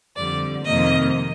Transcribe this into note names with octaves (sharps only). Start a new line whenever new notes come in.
F2 D3 G3 D5
F2 C3 D#3 A#3 D#5